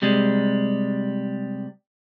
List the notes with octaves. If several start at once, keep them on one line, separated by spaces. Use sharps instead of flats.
C3 G3 G#3